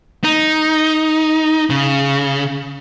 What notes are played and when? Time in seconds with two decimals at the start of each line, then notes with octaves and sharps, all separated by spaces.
0.24 D#4
1.70 C#3